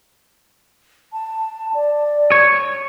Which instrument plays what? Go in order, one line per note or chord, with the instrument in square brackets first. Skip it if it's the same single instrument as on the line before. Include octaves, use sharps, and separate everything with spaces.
[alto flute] A5
D5
[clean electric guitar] C#5